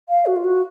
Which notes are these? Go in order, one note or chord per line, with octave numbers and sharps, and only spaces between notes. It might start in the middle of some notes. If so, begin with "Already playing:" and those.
F5
F#4
F4
F#4